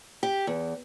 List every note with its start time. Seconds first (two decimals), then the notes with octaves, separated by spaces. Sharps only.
0.23 G4
0.47 E2